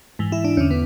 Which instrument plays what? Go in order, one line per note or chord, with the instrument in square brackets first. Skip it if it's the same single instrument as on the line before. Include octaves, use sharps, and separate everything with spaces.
[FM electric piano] G#2 E3
E4
D4
E2 D3 C#4
B3